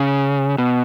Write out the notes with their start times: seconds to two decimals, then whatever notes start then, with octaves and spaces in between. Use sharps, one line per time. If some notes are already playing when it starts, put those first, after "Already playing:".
Already playing: C#3
0.58 B2